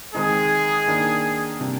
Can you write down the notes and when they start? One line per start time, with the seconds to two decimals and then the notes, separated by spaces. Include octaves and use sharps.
0.14 D#3 G#3 C4 D#4 G#4
0.87 D#3 A#3 D4
1.60 C3 G3 A#3 D4